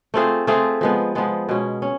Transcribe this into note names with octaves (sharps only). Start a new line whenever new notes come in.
A3 C4 F4 G#4
A3 C4 F4 G#4
F3 G#3 B3
F3 G#3 B3
B2 G#3 C#4
C#4